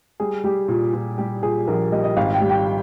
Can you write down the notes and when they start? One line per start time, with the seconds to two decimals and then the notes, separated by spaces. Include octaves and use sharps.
0.20 G3 G#4
0.44 G3 G4
0.68 A#2
0.93 A#2
1.18 G3 G4
1.43 A#2 G#4
1.68 A#1 A#4
1.92 G3 D#5
2.04 D#5
2.16 G#1 F5
2.34 G5
2.41 G3
2.49 G5